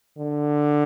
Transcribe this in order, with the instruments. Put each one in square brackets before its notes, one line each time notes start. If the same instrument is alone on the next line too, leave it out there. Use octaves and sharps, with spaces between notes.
[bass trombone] D3